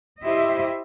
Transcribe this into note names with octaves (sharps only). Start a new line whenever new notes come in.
E4 G4 C5 D#5 E5